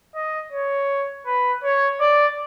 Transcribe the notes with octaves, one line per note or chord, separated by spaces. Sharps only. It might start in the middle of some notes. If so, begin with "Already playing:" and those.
D#5
C#5
B4
C#5
D5